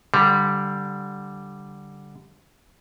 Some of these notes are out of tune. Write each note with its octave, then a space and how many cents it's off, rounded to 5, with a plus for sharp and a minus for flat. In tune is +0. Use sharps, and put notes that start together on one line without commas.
D3 -5 G3 -5 F5 +30